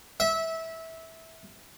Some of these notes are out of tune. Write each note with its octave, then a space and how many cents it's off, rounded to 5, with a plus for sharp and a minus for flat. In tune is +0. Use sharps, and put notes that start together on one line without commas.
E5 -20